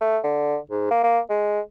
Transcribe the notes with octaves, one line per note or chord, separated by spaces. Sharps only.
A3
D3
G#2
A#3
A#3
G#3